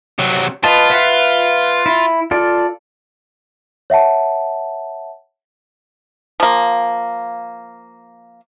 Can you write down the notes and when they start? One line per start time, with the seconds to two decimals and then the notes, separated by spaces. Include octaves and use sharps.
0.19 C3 F#3
0.64 F4 B4 D#5 A5
0.90 B4 E5 F#5
1.86 E4
2.31 F4 A4 D5
3.90 C#5 E5 F#5 A5
6.40 F3 A#3